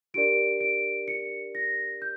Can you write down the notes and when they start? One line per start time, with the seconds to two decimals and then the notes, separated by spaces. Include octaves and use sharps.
0.14 D4 G4 A#4 D5 D7
0.61 D7
1.08 C#7
1.55 A#6
2.02 G6